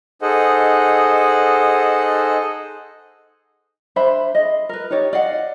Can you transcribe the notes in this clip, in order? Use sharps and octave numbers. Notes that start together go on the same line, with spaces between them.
D#4 G#4 A4 C5 D#5 F#5
D4 C5 E5 B5
G#4 D#5
A#4 B4
D#4 G4 C#5 D5
D5 D#5 F5 F#5